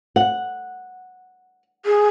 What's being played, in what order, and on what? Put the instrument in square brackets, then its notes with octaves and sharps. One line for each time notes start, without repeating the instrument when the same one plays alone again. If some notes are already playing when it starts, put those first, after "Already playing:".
[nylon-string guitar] F#5
[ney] G#4